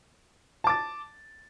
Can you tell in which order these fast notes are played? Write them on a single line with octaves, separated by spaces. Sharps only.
A5 D6 A6